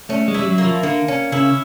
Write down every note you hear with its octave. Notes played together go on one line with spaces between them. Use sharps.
A3 C#4
G#3
G3 E4
F#3
A#3
F3
D3 A#3
C#4
C#3 E4